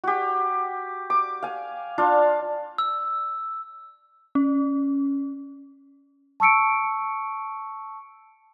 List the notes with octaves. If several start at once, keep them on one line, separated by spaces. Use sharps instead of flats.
F#4 G4
D6
F5 G#5
D4 F4 F5
E6
C#4
A5 C#6 E6 C#7 D7